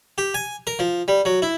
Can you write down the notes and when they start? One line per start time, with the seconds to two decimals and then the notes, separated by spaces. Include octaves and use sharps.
0.18 G4
0.34 G#5
0.67 A#4
0.79 F3
1.08 G3
1.25 F#3
1.42 E4